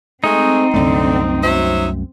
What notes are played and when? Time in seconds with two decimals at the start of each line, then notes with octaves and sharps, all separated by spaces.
0.24 G#3 A3 C4 D#4
0.74 C2 F#2 D3 A3
1.42 F#3 C5 E5